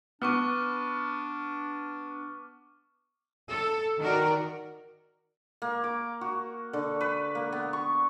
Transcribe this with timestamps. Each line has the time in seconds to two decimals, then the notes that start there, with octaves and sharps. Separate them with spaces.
0.22 B3 D4 C#6 D6 F6
3.49 A4
4.01 D#3 F#4 A#4 D5
5.62 A#3
5.84 D6
6.21 F#4
6.73 D3
7.01 B4
7.35 A#3
7.52 B3
7.73 C#6